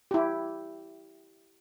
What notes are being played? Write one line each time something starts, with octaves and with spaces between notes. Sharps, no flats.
E4 G4